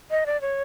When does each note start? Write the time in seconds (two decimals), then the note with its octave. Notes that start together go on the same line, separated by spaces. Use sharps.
0.11 D#5
0.26 D5
0.41 C#5